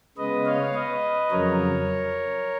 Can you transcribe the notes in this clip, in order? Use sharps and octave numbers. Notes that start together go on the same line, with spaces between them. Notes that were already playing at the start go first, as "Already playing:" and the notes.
C#3 G#3 B3 B4 D#5
C#5 F5
B4 D#5
F2 C#3 F#3 A#4 C#5